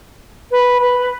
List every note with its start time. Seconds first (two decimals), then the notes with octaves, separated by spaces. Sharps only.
0.51 B4
0.80 B4